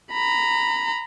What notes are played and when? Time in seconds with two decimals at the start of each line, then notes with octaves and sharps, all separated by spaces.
0.12 A#5 B5